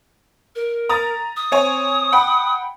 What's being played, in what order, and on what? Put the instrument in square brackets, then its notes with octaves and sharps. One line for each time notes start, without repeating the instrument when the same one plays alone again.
[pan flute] A#4
[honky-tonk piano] A#5 D#6 A6
[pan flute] D#6
[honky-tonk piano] C4 C#5 G#5
F#5 G5 B5